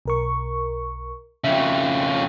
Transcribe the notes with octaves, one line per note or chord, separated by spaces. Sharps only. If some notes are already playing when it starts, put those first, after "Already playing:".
B1 A#4 C#6
F2 C#3 E5